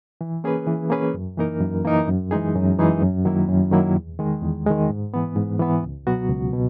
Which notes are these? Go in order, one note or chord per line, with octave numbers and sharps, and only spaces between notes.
E3
A#3 C#4 G#4 B4
E3
A#3 C#4 G#4 B4
F#2
E3 A#3 D#4 A#4
F#2
E3 A#3 D#4 A#4
F#2
E3 G#3 D#4 G#4
F#2
E3 G#3 D#4 G#4
F#2
D#3 F#3 A#3 E4
F#2
D#3 F#3 A#3 E4
E2
D#3 G#3
E2
D#3 G#3
G#2
E3 B3
G#2
E3 B3
C#2
B2 F#3 B3 F#4
C#2
B2